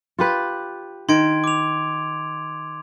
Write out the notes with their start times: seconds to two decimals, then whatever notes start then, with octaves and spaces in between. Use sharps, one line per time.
0.18 F4 G4 B4
1.09 D#3 C6 G#6 D7
1.44 D6 F7